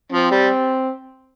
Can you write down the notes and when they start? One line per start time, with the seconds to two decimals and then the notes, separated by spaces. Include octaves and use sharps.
0.12 F3 C4
0.31 G3